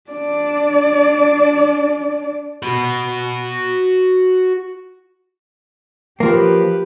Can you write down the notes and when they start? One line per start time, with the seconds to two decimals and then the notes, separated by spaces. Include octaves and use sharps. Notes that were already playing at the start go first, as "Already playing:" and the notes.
0.10 D4 D5
2.63 F#4 B5
6.20 F3 A#3 G4 B4